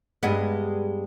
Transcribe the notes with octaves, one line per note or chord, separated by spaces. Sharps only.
G2 G#3 B3